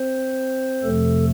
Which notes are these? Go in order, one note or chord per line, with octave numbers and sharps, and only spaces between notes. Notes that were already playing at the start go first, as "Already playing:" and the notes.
Already playing: C4 C5
F2 C3 F3 A3 A4